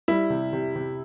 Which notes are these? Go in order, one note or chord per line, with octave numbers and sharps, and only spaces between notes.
G3 E4
C3
C3
C3